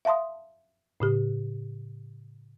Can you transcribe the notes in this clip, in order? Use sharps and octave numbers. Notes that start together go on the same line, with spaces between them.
E5 F5 A5 C6 D#6
A2 C#3 G4